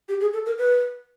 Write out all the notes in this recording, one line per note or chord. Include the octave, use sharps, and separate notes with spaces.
G4
G#4
A4
A#4
B4